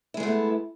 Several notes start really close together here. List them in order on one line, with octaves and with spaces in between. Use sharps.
E4 G#3 B3 A3